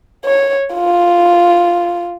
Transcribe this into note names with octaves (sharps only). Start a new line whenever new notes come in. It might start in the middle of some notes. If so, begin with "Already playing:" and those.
C#5
F4